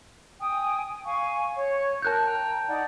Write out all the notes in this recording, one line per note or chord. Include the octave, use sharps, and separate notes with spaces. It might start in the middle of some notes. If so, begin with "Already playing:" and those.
G5 G#5 D#6
F5 G#5 C#6
C#5
A#4 A5 F#6 G6
G5 A#5
D#4 D5 F#5